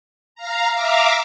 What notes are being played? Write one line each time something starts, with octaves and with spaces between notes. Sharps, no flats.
F5 A#5
E5 F5 A#5 D6